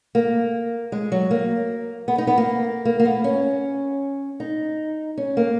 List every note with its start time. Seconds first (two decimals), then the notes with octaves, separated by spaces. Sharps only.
0.15 A#3
0.92 G#3
1.12 F#3
1.31 A#3
2.08 B3
2.18 D#4
2.27 B3
2.38 A#3
2.85 A#3
3.00 A#3
3.05 B3
3.24 C#4
4.40 D#4
5.17 C#4
5.37 A#3